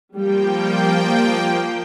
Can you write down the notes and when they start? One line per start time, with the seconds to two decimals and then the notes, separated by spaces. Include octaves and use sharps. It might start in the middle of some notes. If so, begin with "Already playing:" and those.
0.15 F3 G3 A#3 G5